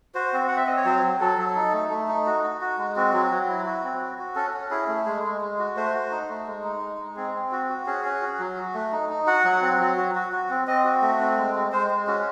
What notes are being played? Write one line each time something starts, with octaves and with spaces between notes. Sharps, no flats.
F#4 C5
C4
C4 F#5
E5
C4 D#5
C#5
F#3 C5
F#3
F#3 A4
F#3
D#4
A3
A3
D#4
F#4
F#4
F#4
G#3
C4 F#4
F#3
F#3
E4
F#4
C4
F#4
F#4
C#4 A4
C#4
E4 G#4
A3
G#3 G#4
G#3
G#3
F#4
A3 C5
F#4
D#4
A3
G#3
D#4
G#3
G#3
C4 G#4
C4
F#4
F#4
C#4 G#4
C#4
F#4
F#3
F#4
A3
D#4
D#4
F#4 F#5
F#3
C4
F#3
F#4
F#4
F#4
C4
C4 D#5
F#4
A3
C4
G#3
G#3
G#3 C5
G#3
C#4 F#4